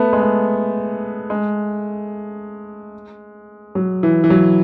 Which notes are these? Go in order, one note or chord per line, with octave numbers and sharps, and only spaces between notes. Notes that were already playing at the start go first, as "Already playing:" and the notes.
Already playing: A3 B3
G#3
A3
G#3
F#3
E3
E3
F#3